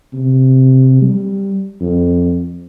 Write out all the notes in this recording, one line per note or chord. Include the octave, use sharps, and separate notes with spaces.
C3
G3
F2